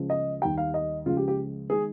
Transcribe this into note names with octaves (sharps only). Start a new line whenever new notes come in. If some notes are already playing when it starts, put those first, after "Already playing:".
Already playing: C#2 C#3 F3 G#3
D#5
D#2 D#3 G3 G5
F5
D#5
C#2 C#3 F3 G#3 F4
G4
G4
D#3 G#3 G#4